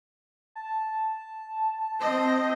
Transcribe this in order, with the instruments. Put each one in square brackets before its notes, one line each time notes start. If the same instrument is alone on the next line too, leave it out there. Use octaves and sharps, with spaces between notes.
[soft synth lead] A5
[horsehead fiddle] C4 D#5